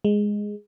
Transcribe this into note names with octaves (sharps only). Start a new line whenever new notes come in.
G#3